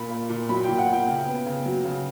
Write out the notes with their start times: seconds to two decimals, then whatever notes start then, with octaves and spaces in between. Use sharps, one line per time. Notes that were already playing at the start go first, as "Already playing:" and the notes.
Already playing: A#2 B5
0.10 A#3
0.29 A#2
0.49 F#3 B5
0.64 G5
0.69 A#2
0.78 F#5
0.87 A#3
0.93 G5
1.07 C#3
1.26 B3
1.46 C#3
1.65 F#3
1.85 C#3